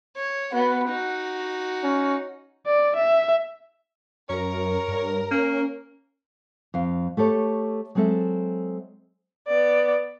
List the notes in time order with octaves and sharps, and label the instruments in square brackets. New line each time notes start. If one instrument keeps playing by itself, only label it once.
[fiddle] C#5
[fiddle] B3 F#4 [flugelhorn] F#5
[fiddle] D#4 F#4
[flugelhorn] C#4
[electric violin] D5
E5
[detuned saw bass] F#2 [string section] A#4 [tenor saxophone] C#5
[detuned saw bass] G2
[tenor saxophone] A#3 [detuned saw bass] C#4
[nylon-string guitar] F2 F5
A3 G4 A4 C#5
F#3 G#3 C4 A4 E5
[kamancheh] B3 D5